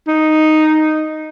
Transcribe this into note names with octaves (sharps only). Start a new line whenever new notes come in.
D#4